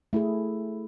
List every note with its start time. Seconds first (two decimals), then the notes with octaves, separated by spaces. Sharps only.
0.13 A3 E4 G#4